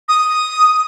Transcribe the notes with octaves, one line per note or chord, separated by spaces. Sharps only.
D#6